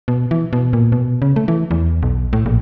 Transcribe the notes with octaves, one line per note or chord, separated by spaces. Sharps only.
B2
E3
B2
A#2
B2
C#3
A3
E3
E2
B1
A2
A#1